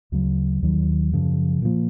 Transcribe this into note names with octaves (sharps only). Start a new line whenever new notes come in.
D2 C#3 F#3
D#2 D#3 F#3
F#2 C#3 F3
A#2 F3 A#3